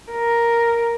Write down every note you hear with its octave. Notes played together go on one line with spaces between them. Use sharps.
A#4